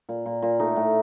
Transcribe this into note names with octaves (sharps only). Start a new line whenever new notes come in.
A#2
A#2
A#2
A3 D#4
A2